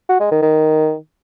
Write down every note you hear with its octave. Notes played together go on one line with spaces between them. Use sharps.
F#4
G#3
D#3
D#3